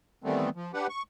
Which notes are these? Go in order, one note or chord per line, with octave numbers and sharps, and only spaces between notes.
D#3 E3 G3 A3 B3 C4
F3
D4 G4 B4 F#5
C#6